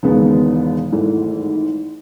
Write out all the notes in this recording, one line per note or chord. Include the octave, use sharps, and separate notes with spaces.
E1 D#2 C#3 G#3 B3
G#1 G#2 E3 A3 E4